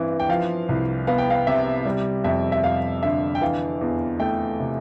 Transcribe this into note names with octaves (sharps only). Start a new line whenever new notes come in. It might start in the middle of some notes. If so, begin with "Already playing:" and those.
Already playing: G2 E3 C4
G5
F3 F5
C2
B3 F5
G5
F5
C3 E5
G3
F2 E5
E5
F2 F5
D3 E5
G5
E3 F5
E2
A3 G5
C3